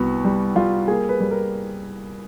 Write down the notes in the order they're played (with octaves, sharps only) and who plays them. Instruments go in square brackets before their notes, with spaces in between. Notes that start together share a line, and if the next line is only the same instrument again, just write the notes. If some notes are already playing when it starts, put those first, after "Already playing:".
Already playing: [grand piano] C2 B3 F#4
G3
G3 F4
A#3 G#4
B4
G3
A#4